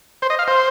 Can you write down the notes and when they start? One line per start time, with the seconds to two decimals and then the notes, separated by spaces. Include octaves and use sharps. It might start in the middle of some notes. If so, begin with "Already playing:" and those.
0.22 C5
0.30 D#5
0.39 F5
0.48 C5